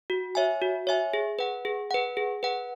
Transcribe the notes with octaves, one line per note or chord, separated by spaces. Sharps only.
F#4
C#5 E5 G#5
F#4
C#5 E5 G#5
G#4
B4 F#5
G#4
B4 F#5
G#4
B4 F#5